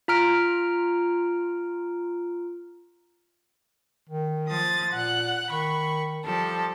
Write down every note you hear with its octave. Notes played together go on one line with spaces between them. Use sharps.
F4 A#5 F6 D7
D#3
F3 D#6 A6
A#2 F#5 F#6
D#3 B5 C#6
F3 G3 A4